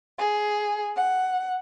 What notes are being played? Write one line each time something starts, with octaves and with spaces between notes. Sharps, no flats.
G#4
F#5